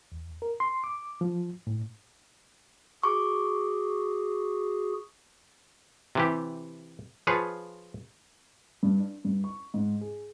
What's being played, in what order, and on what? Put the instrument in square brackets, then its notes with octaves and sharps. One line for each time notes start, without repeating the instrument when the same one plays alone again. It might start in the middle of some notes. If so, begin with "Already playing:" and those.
[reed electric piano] E2
A#4
C6
D6
F3
A2
[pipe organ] F#4 G#4 [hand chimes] C#6 D6
[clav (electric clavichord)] C3 E3 G4
F3 F4 G#4 B4 C#5
[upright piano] G2
D4
G2
C#6
G#2
G#4